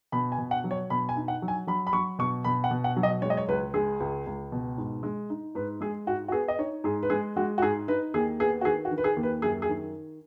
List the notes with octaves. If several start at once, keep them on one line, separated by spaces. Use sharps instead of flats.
B2 B5
G#5
B2
F#5
F#3
C#5
B2 B5
G#5
D#4
F#5
F#3
G#5
F#3 B5
B5
F#3 C#6
B2 C#6
B2 B5
F#5
B2
F#5
F#3
D#5
G#3 C#5
D#5
C#5
C#2 B4
G#3 G#4
C#2
C#2
B2
G#2
G#3
D#4
G#2 B4
G#3 G#4
G#2 F#4
F#4
B3 G#4
D#5
D#4 C#5
G#2 G#4
B4
G#3 G#4
G#3 F#4
F#4
G#2 G#4
D#4 B4
D#2 G#4
B3 G#4
F#4
D#3 G#4
F#4
D#3
B4
G#4
D#2
B4
F#2 G#4
G#4
D#3